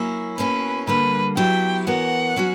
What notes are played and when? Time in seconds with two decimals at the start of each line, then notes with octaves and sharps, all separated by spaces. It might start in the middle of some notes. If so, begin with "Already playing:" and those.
Already playing: F#3 A#3 C#4 E4
0.38 B2 A#3 C#4 E4 B4
0.87 D3 G3 A#3 B4
1.37 F#3 B3 E4 G4 G5
1.87 E3 B3 F#4 A#4 C#5 F#5
2.36 F#3 C#4 F#4